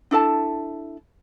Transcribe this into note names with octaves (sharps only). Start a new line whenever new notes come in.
D4 E4 A4 A5